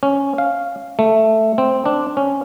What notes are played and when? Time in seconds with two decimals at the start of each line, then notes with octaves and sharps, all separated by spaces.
0.03 C#4
0.38 F5
0.99 A3
1.58 C4
1.86 D4
2.17 C#4